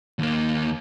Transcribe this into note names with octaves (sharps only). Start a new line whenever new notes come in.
D#2 A#3